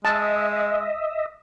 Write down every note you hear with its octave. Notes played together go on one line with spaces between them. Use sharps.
G#3 D#5 E5 A5